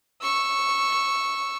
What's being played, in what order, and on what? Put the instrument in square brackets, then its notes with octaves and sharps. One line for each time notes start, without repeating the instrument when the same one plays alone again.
[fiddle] C#6 E6